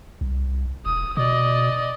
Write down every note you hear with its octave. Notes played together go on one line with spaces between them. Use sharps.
C2
E1 D#6
B2 D5 D#5